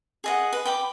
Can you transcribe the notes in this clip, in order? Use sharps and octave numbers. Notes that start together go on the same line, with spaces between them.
G#4 D#5 F#5
B4
G5 B5 D6